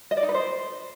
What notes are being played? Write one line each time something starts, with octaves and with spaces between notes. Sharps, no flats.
D#5
D5
D#4
B4
C5